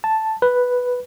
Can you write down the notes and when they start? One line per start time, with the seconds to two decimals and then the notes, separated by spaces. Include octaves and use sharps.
0.04 A5
0.42 B4